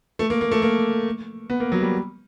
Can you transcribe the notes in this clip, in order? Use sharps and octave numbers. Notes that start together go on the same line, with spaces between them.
A3
A#3
A#3
A3
A#3
B3
A#3
F#3
G3